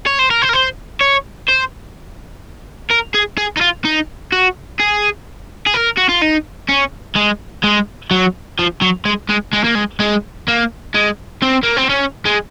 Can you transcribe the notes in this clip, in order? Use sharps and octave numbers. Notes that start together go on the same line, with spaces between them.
C#5
C5
A#4
C5
A#4
C5
C#5
C5
A#4
G#4
G#4
D#4
F4
D#4
F#4
G#4
G#4
A#4
F#4
F4
D#4
C#4
G#3
G#3
F#3
F3
F#3
G#3
G#3
G#3
A#3
G#3
G#3
A#3
G#3
C4
A#3
C4
C#4
G#3